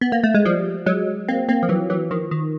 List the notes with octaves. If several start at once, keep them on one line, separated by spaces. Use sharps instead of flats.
B3
A#3
A3
G#3
F3 G3
F#3 G#3
A#3 C4
A#3 C4
F3
E3 F#3
E3 F#3
D#3 F3
D#3